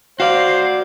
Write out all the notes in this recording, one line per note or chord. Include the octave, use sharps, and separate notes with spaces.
F#4 C5 D5 F5